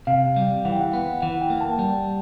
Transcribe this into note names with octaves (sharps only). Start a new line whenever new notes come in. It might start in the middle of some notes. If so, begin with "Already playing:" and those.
C3 F5
G3
E3 F#5
G5
F#5
B3
E3 F#5
G5
A#3
A5
G3